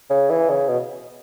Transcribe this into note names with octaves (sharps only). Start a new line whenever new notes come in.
C#3
E3
C#3
B2